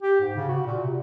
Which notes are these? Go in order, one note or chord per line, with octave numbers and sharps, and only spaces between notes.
G4
G#2
C#3
F#4
A#2
C3